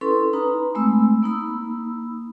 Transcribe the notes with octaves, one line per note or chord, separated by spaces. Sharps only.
C#4 E4 A4 B4 C6
D#4 B4 A#5 B5
G#3 A3 C4 B5 E6
A#3 D#4 B5 E6